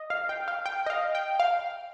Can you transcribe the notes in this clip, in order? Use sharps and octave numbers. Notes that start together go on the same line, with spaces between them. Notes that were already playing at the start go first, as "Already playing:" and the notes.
Already playing: D#5
F5
G5
F5
G5
D#5
F5
G5
F5